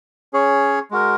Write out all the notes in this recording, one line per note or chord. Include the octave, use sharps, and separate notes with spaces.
C#4 G#4 C#5
G#3 F#4 A#4